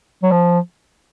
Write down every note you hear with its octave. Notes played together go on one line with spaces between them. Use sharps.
F#3
F3